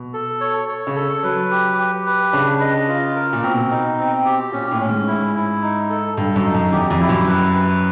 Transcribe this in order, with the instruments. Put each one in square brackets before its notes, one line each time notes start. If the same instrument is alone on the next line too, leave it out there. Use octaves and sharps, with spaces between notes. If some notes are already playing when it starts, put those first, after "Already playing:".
Already playing: [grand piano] B2
[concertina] A4
C#5
C#5
[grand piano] C#3
[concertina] A4
[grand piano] F#3 [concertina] B4
[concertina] G4
G4
B4
[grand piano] C#3 [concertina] D4
[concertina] D#5
F4
A#4
[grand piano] A#2
[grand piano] B2 [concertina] C4
[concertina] D#4
C4
G4
[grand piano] A#2 [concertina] C#4
[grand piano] A2
[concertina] C#4
[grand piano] G#2
[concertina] E4
E4
D#4
A4
[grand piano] G2 [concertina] A4
[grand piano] F#2
[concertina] D#4
[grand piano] F#2
[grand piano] E2 [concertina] G4
[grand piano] F2
[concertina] E4
[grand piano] F#2
[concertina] B4
B4